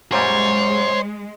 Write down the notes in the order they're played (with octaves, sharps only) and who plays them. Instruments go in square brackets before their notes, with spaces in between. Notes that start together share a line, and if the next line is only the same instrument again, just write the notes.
[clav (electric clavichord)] F#2 A#2 G3 [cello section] G#3 [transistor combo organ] C5 [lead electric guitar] C#5